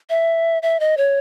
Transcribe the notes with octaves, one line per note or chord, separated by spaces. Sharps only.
E5
E5
D#5
C#5